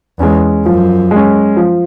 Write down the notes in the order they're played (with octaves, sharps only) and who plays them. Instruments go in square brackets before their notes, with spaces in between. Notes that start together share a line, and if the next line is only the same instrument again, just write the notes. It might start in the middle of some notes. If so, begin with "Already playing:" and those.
[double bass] E2 [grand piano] G#3 C#4
[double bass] F#2 [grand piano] F3
[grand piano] G#3 C#4
F3